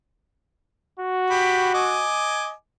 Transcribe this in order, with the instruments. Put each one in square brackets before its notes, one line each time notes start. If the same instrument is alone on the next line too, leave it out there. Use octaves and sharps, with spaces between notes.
[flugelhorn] F#4
[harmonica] G4 B5
D#5 G#5 D6